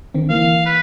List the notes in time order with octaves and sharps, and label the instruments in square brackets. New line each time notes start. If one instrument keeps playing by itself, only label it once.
[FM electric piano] D3 D#3 C4
[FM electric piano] E3 A#3 [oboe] F5
[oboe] B4